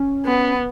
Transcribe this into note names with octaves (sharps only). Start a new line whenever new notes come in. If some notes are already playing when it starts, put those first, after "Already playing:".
Already playing: C#4
B3